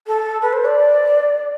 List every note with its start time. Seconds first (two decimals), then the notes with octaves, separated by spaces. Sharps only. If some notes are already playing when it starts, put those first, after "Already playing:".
0.07 A4
0.42 B4
0.53 C5
0.65 D5